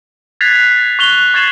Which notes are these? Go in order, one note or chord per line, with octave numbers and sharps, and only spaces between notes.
F#6 G#6 A6 B6 C7 F7
C#6 F#6 F7 G7
C#6 G#6 A6 C7 E7 F#7